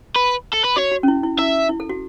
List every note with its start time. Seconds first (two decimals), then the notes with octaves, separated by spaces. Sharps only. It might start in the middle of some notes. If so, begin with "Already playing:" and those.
0.16 B4
0.54 A4
0.65 B4
0.77 F#4 C#5
0.92 F#4
1.03 C#4
1.08 E4
1.23 E4
1.39 E4 E5
1.69 E4
1.80 A4
1.89 F#4